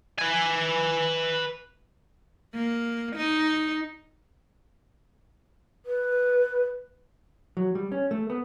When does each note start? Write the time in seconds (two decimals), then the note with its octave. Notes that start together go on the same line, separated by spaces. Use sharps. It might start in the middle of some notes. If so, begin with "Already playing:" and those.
0.19 B4 G#5
2.55 A#3
3.16 D#4
5.86 B4
7.57 F#3
7.75 G3
7.92 C#4
8.11 A3
8.30 B3